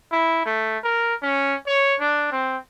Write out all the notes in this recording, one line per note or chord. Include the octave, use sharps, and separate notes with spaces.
E4
A3
A#4
C#4
C#5
D4
C4